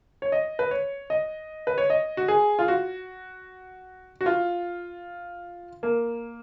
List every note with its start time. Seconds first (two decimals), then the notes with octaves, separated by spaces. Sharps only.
0.22 C#5
0.32 D#5
0.59 B4
0.71 C#5
1.10 D#5
1.67 B4
1.78 C#5
1.90 D#5
2.17 F#4
2.28 G#4
2.59 F4
2.68 F#4
4.21 F#4
4.26 F4
5.83 A#3